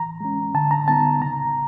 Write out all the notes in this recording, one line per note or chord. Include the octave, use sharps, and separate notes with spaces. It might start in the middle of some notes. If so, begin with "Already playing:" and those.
Already playing: E3 A#5
G#3 C#4
D3 A5
A#5
G3 B3 D#4 A5
C#3 A#5